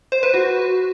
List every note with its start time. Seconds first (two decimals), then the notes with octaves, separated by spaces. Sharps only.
0.12 C5
0.23 B4
0.34 F#4